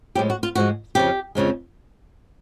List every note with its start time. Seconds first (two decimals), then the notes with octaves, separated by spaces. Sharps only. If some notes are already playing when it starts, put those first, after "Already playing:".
0.15 A2 F3 G#3 G4
0.30 F#4
0.43 F4
0.55 G#2 F3 G#3 F#4
0.95 F2 C#3 F3 G4
1.35 F2 C#3 F3 G#3